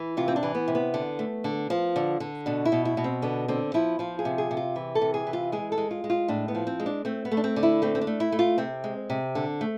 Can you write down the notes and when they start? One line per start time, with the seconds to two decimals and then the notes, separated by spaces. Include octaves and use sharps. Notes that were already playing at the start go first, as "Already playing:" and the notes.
Already playing: E3
0.17 C3 F4
0.28 C4
0.36 D4
0.43 E3
0.55 B3
0.68 C3
0.75 B3
0.94 D3
1.19 A3
1.44 D3
1.70 F3
1.96 D3
2.20 D3
2.46 B2 D4
2.65 E4
2.72 B2
2.85 E4
2.97 B2
3.04 C4
3.22 D3 B3
3.48 D3 C4
3.74 F3 E4
3.99 F3 F4
4.19 G#4
4.25 C3
4.38 G#4
4.51 C3
4.57 F4
4.76 E3
4.95 A4
5.01 C3
5.14 G#4
5.27 E3
5.33 F4
5.52 G#3 G#4
5.72 A4
5.78 G#3
5.91 F4
6.04 G#3
6.10 F4
6.28 A2 D4
6.48 B3
6.55 F3
6.67 C4
6.80 G#3
6.86 D4
7.05 A3 C4
7.25 B3
7.31 A3
7.37 D4
7.44 C4
7.56 D3
7.63 E4
7.82 A3 C4
7.95 C4
8.01 D4
8.07 A3
8.20 E4
8.32 A3
8.39 F4
8.58 C3 C4
8.84 G#3
9.10 C3
9.35 D3
9.61 A3